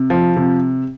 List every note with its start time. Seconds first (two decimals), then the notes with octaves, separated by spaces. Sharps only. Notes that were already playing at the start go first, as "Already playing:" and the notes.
Already playing: C3
0.10 F3
0.36 C3